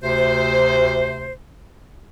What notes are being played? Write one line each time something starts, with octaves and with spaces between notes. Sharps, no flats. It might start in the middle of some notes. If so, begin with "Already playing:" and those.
D2 C3 C5